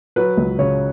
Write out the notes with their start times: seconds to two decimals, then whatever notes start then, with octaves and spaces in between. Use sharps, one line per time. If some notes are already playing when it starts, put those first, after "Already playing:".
0.16 F#3 B4
0.38 C#2
0.59 C#3 C#5